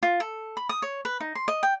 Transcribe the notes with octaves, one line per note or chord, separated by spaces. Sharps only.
F4
A4
B5
D#6
C#5
B4
D#4
C6
D#5
G5